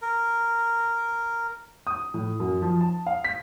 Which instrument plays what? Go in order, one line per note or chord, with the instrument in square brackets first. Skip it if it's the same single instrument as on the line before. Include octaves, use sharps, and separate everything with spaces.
[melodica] A#4
[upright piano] D#6
A2
F#2
F3
A5
F5
B6